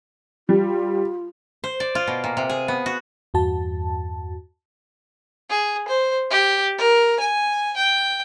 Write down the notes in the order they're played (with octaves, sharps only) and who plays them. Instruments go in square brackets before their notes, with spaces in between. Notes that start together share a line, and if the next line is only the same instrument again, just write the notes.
[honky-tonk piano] G3 [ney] F4
[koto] C5
D5
F4
B2
A#2
C3
G#4
B3
F#4
[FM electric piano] E2 G2 F#4 A5
[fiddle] G#4
C5
G4
A#4
G#5
G5